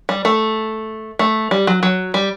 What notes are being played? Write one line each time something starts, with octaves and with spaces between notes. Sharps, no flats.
G3
A3
A3
G3
F#3
F#3
G3